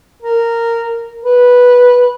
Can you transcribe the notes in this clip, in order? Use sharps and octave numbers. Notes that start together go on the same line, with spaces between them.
A#4
B4